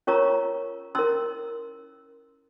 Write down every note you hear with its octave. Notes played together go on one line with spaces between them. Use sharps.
C#4 F4 A#4 C#5 A#5 C#6
C#4 E4 A#4 C6 E6